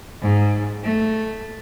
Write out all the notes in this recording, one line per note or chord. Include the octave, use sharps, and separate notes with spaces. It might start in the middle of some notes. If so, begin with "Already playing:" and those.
G#2
A3